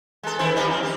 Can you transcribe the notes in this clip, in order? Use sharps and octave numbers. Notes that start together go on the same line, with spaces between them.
G#3 A4
D#3 E4 C5
G3 D#4 E4
F2 C4
C4 G4